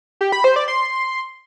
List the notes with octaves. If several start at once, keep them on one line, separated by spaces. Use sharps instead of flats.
G4
B5
C5
D5
C6